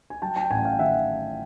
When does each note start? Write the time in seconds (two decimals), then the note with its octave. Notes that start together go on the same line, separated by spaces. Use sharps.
0.10 G#5
0.22 F#3 G5 A5
0.36 G5 A5
0.51 A1 F#5 G#5
0.65 F5 G5
0.79 D#3 E5 F#5